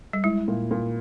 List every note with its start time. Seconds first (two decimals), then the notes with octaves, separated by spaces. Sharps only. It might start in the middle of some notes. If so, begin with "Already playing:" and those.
0.13 G3
0.24 G#3 E4
0.48 A#2
0.71 A#2